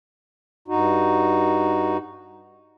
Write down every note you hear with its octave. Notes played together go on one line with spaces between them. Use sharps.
G2 D#4 F#4